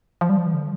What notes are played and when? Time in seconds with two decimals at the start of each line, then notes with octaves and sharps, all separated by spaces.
0.21 F3
0.29 G3
0.38 F3
0.46 E3
0.54 D3